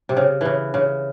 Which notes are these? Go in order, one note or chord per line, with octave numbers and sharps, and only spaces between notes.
C3
C#3
C#3 E3
C#3